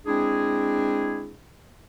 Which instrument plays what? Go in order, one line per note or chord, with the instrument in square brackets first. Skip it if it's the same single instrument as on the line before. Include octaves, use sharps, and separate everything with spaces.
[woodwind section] G#3 C4 D4 E4 G#4